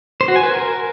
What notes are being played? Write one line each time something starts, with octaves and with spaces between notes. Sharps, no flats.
C5
F#4
G#5
B4
A#4